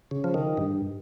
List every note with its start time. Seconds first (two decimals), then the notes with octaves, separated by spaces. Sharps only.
0.11 C#3
0.24 F3
0.34 D#3
0.57 G2